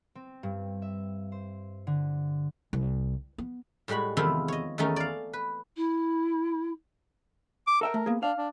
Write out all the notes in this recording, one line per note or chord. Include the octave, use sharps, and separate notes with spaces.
C4
G2
E5
C5
D3
C2
B3
A2 G3 G#3 F#4 B5
E2 C3 D#3 F3 E4 F4
C#5 D#5
E2 D#3 A3 C#4 D#4
D5 F5
B4
E4
D6
A4 A#4 E5 G5
A3
A#3 B3 G#4
D4 F5
D4